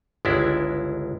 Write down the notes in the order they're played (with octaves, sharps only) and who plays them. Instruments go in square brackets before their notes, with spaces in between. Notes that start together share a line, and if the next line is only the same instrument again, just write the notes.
[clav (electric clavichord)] G1 C#2 G#3 D4 E4